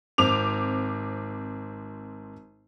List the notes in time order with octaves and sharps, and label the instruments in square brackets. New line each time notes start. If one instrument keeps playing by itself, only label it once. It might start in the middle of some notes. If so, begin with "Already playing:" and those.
[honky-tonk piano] G#1 C4 D6 F7